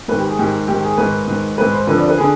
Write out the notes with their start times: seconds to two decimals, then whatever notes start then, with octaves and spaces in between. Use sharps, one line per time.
0.08 G#2 D#3 B4
0.19 G4
0.29 G#4
0.39 G#2 D#3 G4
0.68 G#2 D#3 G4
0.83 G#4
0.98 G#2 D#3 B4
1.28 G#2 D#3
1.58 G#2 D#3 B4
1.73 C5
1.87 F2 D3 B4
1.98 D5
2.08 B4
2.18 D3 G#4